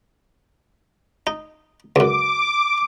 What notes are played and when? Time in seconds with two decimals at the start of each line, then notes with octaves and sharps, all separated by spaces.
1.27 D#4
1.96 C#2 F#2 D6